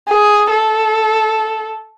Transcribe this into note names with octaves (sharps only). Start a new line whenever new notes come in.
G#4
A4